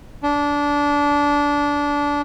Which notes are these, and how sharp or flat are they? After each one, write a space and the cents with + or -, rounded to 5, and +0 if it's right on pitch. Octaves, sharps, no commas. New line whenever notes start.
D4 -20